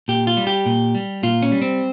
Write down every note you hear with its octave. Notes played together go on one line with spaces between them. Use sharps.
A#2 G4
F4
G3
G4
A#2
G3
A#2 F4
C#4
G3
C4